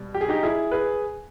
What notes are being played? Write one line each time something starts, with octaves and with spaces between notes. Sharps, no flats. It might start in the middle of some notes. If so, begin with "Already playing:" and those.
Already playing: B2 G3
G4
G#4
D#4 G4
E4 G#4
G#4 B4